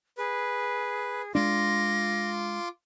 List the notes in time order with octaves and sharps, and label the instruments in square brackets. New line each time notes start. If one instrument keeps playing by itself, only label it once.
[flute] G#4 [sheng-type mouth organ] B4
[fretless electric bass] G#3 D4 [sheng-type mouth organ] F4 C6 D6 [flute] A#6